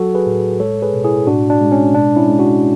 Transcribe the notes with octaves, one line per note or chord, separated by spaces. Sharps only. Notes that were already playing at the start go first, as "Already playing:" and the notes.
Already playing: F#3 F#4 A4
G#4 B4
A2
G#3 A4 C#5
G#4 B4
B2
E4 G#4
A2 D4 F#4
D4
G#3
C#4
B2 D4
C#4 E4
G#3
D4 F#4